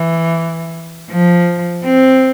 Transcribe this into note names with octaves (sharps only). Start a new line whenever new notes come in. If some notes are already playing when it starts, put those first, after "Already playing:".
Already playing: E3
F3
C4